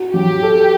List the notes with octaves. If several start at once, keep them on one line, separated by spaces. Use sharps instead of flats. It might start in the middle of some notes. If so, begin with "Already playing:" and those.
Already playing: F#4
F#3 G4
A4